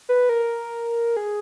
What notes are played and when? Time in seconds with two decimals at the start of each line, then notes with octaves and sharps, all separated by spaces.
0.09 B4
0.29 A#4
1.17 G#4